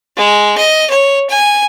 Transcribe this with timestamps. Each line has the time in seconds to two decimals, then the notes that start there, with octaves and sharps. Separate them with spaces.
0.17 G#3
0.58 D#5
0.90 C#5
1.29 G#5